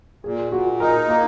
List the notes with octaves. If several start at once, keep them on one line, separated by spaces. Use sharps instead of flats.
A#2 G#4
A#2 F#4
D#4 A#4
A#3 A#4